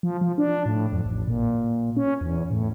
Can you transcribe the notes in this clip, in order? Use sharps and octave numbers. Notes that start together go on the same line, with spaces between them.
F3
F3
D4
A2
F2
A1
A#2
C#4
E2
A2